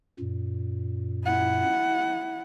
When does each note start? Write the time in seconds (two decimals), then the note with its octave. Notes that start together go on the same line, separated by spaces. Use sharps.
0.19 F#2 A#2
1.24 E4 F#5